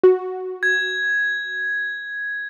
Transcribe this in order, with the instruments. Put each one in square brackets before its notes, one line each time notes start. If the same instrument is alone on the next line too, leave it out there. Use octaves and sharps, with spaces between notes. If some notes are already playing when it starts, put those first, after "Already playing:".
[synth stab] F#4
[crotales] G#6